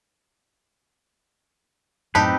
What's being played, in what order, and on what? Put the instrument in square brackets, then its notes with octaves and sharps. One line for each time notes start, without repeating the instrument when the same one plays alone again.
[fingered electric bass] F#2 A2 [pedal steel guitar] C4 B4 [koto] D#4 G4 [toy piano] A5